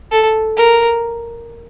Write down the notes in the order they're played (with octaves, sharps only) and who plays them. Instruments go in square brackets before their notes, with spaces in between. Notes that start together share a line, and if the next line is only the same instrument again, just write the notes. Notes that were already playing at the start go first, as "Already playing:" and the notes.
[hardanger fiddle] A4
A#4